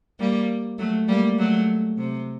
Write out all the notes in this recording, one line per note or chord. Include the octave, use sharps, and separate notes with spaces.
G3 A#3
F#3 A3
G3 A#3
F#3 A3
C3